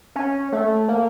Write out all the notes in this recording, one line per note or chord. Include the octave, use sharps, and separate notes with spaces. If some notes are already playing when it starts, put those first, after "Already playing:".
C#4
A3
A#3